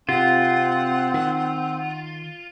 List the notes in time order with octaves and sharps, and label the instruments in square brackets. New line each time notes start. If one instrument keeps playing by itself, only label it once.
[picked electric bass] C3 [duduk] C4 [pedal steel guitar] F4 [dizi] F#5
[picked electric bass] D#3